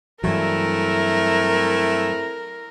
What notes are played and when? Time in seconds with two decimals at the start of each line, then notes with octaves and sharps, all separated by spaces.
0.24 G2 E3 F#3 A3 C4 E4 A#4